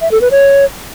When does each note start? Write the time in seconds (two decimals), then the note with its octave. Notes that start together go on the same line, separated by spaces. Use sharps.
0.02 E5
0.11 A4
0.21 B4
0.31 C#5